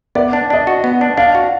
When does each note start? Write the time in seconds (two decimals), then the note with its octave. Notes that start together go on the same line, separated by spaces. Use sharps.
0.15 B3 D5
0.33 D4
0.50 D4 D#5
0.67 F#4
0.84 B3
1.01 D4
1.17 D4 F5
1.35 F#4